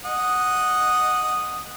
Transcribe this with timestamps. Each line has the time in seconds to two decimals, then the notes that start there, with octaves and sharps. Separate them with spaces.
0.05 D#5 F#5 D#6